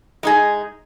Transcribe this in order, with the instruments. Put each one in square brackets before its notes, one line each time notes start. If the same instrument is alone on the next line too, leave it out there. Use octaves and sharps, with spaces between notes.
[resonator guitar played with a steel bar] G#3 D#4 G#4